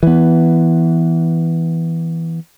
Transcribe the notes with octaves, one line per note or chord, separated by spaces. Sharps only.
E3 B3